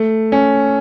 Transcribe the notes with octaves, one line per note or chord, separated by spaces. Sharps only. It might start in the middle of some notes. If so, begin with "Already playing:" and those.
Already playing: A3
C#4